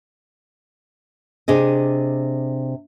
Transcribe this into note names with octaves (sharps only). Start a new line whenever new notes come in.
C3 D4 G#4 D#5